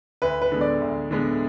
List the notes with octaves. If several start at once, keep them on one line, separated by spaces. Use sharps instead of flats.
D2 B4
B4
D3 G#3 B3
D5
D2
D3 G#3 B3